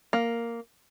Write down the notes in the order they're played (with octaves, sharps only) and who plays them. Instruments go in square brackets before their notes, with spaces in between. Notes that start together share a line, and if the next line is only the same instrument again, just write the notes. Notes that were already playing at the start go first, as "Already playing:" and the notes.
[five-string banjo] A#3